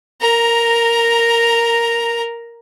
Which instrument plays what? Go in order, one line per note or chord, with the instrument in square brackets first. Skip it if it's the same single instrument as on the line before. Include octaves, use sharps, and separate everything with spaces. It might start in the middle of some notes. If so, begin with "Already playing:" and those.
[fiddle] A#4 A#5